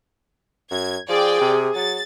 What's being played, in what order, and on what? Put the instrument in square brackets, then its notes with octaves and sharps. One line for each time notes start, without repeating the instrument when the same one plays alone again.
[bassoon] F#2 [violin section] G#6
[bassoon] F3 [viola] G#4 [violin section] D5 G5
[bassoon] C3
[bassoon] F#3 [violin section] A6